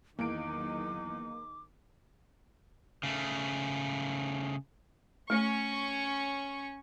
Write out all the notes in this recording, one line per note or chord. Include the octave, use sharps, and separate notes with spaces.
E2 D#3 F#3 A#3 D#4 D6 D7
C#3 A3
A3 C#4 C#6